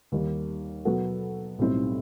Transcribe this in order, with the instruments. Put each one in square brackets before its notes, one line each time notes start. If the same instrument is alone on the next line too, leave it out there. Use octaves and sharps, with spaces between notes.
[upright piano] D#2 D#3 G3 D#4
B2 F#3 B3 F#4 A4
B1 A2 G3 C4 D#4